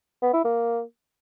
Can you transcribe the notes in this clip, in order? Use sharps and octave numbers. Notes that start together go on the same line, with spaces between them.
B3
E4
A#3